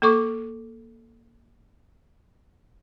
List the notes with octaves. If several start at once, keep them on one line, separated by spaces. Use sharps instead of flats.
A#3 A4 C#6 D6